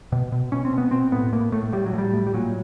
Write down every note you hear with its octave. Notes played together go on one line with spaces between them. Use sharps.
B2
B2
B2 C#4
C4
B2
B3
B2 C4
A2 B3
A2 A#3
A2 A3
A2 G3
F#3
A2
G3
A2
G3
A#2 F#3